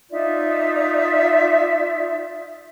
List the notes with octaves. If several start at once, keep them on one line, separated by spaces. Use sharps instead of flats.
D#4 F4 D5 E5